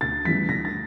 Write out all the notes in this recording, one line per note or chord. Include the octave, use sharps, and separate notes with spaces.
D2 A6
C#3 E3 G3 B6
D2 A#6
A6